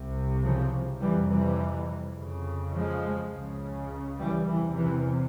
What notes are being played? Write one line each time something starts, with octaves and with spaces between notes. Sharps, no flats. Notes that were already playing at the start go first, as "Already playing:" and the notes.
Already playing: C2 C3
C#3 F3
F2 C3 E3 G3
E3 G3
F2 C#3
F3 G#3
C#2 C#3
E3 G3
E2 C3 E3
E3